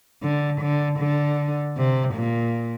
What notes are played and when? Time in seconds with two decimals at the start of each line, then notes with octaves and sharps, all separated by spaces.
0.22 D3
0.61 D3
0.99 D3
1.77 C3
2.15 A#2